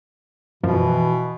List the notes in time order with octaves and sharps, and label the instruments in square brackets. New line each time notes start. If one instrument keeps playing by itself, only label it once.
[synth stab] F#2 F3 [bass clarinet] B2 [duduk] E3